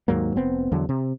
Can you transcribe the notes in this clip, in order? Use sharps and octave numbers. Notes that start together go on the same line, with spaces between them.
D#2 G#2 F#3 A#3
F1 B3 C4
E2 D3 F#3
C3